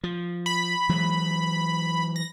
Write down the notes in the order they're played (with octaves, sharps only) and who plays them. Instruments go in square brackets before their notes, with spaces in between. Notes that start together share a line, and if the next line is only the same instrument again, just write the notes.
[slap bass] F3
[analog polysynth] B5
[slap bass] E3 F#3 G#3
[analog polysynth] A#6